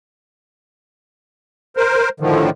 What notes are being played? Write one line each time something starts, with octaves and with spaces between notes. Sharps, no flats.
A#4 C5
A2 D3 D#3 F3